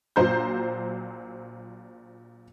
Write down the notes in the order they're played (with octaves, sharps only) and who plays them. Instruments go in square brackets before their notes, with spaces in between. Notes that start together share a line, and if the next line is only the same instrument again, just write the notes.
[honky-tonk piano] A#1 A#2 F#3 C5 A#5 G6